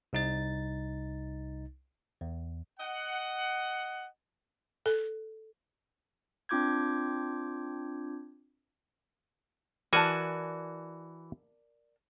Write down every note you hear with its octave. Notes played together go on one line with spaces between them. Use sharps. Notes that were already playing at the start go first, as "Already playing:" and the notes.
C2 D#4 A6
E2
D#5 F#5
A4
C4 D4 F4 D6 G6 G#6
E3 F#4 A#4 D5 G#5 A5